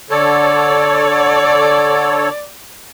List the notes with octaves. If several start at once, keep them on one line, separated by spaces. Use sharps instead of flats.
D3 A4 C#5 D5